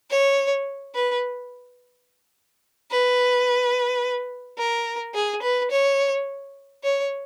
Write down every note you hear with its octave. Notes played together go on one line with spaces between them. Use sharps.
C#5
B4
B4
A#4
G#4
B4
C#5
C#5